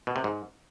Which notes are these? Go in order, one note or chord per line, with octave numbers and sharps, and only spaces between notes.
B2
C3
G#2